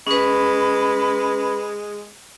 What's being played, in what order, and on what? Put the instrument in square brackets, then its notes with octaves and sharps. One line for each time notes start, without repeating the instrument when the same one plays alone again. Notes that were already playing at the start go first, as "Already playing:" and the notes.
[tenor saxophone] G#3 [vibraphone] C#4 B4 [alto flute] B5